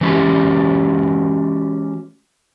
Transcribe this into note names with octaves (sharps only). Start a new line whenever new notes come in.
E3 G#3 C#4 F#4 G4